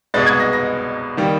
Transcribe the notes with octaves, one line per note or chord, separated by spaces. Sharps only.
C2 B2 G#3 B3 A6
G#6
A#6
A#6
D#3 G3 A#3